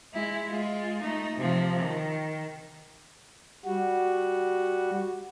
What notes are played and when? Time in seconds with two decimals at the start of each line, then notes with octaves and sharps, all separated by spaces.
0.13 G#3 E4
0.47 G#3 F4
1.01 A3 D#4
1.36 C3 F3
1.79 D#3
3.65 G3 F#4